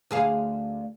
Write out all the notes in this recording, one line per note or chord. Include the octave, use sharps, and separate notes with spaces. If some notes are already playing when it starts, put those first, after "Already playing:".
D2 G#4 F5